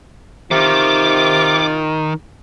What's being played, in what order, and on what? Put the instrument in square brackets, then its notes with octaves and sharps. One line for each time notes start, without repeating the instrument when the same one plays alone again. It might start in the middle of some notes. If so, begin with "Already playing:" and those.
[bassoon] C3 [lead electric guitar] D#3 [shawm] F4 [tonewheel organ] D6